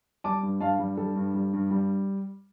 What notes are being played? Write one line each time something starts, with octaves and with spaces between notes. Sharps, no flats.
G3 A5 D6
G2
G2 F5 A5
G3
G3 A4
G2
G3
G2
G3